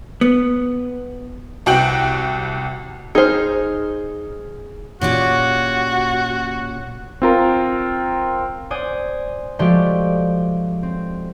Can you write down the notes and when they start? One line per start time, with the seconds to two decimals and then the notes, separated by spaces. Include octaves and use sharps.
0.21 B3
1.66 C2 F#4 G5 D7 F#7
3.15 D#4 G#4 C5 F6
5.01 A#2 C#4 F#4 G4
7.22 C4 F4 A#4
8.71 C5 D5 F#5 G#5 D#6
9.59 F3 G#3 A3 F#4 G4 D5
10.83 C4